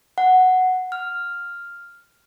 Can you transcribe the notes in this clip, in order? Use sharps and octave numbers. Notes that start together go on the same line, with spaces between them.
F#5
F6